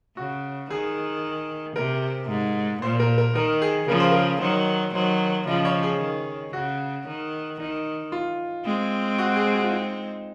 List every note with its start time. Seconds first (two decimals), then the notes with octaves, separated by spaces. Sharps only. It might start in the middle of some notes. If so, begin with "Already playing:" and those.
0.17 C#3 F#4
0.70 D#3 G#4
1.76 C3 A#4
2.29 G#2
2.82 A#2 C5
3.00 A#4
3.18 A#4
3.35 D#3 A#4
3.62 G#4
3.88 C#3 F3 A#4
4.00 C5
4.12 A#4
4.41 D#3 F#3 C5
4.95 D#3 F#3 C5
5.47 C#3 F3 D#5
5.65 C#5
5.83 G#4
6.00 D#3
6.53 C#3 F#4
7.07 D#3
7.60 D#3 D#4
8.12 F4
8.65 G#3 C4
9.18 F#4
9.36 G#4
9.54 F#4
9.64 F4
9.72 D#4